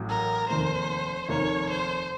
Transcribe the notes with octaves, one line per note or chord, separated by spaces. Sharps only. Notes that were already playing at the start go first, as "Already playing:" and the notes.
Already playing: A1 A2 F#3
A#4
F1 D#2 D#3 A#3 C5
F1 D#2 D#3 A#3 C#5
C5